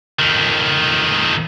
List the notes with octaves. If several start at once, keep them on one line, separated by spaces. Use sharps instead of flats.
F2 D#3